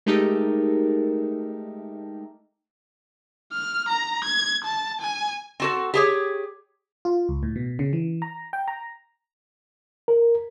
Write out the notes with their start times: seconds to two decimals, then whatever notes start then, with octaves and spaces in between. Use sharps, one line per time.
0.06 G#3 A3 D#4 G4 A4 A#4
3.53 F6
3.89 A#5
4.25 G#6
4.65 A5
5.01 G#5
5.60 C4 F#4 A4
5.94 G4 G#4 C#5
7.05 F4
7.29 C#2
7.43 A2
7.56 B2
7.79 C#3
7.93 E3
8.22 A#5
8.53 G5
8.68 A#5
10.08 A#4